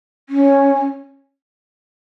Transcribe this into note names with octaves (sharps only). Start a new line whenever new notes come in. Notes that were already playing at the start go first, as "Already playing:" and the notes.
C#4